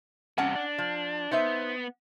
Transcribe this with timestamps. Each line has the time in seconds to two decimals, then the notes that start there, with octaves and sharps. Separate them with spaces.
0.38 G2 C3 C#4 F#5 A5
0.55 D4
0.78 F3
1.31 B3 D#4 C5 E5